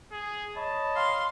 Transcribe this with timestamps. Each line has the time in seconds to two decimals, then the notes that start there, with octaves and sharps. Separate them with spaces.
0.12 G#4
0.56 C#5 D#5 A5 B5
0.96 F5 C6